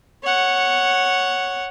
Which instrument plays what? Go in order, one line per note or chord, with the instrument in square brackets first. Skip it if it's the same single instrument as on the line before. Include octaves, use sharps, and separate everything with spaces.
[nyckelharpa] C#5 F#5